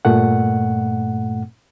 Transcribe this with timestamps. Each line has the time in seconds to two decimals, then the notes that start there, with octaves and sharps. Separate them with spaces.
0.05 G2 A#2 A3 F#5